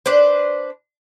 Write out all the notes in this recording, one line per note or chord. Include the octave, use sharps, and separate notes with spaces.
D4 B4 C5